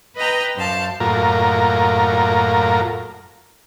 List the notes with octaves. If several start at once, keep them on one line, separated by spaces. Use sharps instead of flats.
B4 D#5 G5 A#5
F#2 C5 F5 A5
F#2 A2 A#3 F4 A#4